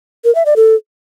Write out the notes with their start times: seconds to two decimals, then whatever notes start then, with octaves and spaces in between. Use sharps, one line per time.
0.24 A#4
0.35 E5
0.46 D5
0.56 A4